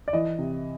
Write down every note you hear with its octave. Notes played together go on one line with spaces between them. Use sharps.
D5
E3 D#5
C3